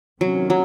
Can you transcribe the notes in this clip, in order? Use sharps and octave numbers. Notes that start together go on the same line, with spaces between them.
C3 D#3 F#3 A#3 C#4
F#3